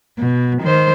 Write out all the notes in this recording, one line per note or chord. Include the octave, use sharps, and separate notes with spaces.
B2
D#3 C5